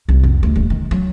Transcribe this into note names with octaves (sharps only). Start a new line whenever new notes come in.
C2
F2
D2
D#1
D#3
F#3